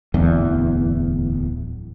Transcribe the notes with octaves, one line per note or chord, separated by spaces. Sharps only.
D1 E2